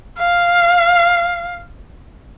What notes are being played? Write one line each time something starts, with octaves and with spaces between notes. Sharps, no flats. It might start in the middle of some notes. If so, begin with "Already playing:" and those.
F5